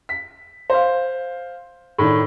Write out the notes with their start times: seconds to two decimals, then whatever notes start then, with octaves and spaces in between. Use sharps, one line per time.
0.09 B6
0.70 C5 F5
1.99 A2 D#3 D4